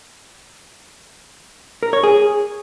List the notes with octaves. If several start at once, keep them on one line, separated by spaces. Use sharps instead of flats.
A#4
C#5
G#4